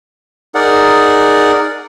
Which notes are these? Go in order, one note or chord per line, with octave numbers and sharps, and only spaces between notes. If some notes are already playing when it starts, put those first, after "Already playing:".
D#4 G#4 A#4 D5 F#5